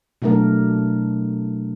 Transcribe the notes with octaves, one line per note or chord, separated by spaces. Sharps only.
B2 F#3 A3 D4 A#4